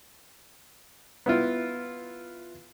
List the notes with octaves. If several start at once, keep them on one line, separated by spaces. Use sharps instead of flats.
B3 E4 F4